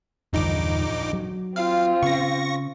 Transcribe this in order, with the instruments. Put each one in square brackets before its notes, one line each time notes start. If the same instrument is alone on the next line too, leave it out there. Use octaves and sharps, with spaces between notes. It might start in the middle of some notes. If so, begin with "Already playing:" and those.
[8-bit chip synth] A#1 D#4 D6 [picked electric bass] E2 G2 D3
[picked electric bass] F#3
[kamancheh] C4 F4 [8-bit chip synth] F5
[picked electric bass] C#3 [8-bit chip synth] C#6 A#6